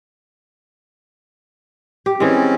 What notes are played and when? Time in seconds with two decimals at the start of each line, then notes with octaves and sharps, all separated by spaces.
2.06 G4
2.20 E3 G#3 C4 C#4